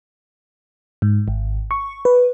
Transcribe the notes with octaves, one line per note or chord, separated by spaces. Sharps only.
G#2
G#1
C#6
B4